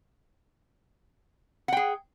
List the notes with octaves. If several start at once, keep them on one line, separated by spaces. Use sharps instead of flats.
G#4 F#5 G5